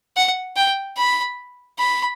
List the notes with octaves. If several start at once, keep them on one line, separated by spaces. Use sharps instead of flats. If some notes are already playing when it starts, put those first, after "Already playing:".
F#5
G5
B5
B5